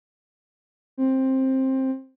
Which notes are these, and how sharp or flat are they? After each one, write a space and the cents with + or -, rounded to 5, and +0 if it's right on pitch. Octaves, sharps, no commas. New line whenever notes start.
C4 +15